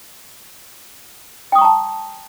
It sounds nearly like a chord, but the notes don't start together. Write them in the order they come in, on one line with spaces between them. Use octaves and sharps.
G5 D#6 C#6 A#5 A5